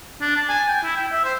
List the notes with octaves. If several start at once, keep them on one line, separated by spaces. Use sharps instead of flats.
D4
A5
G#5
G5
E4
G5
E5
C5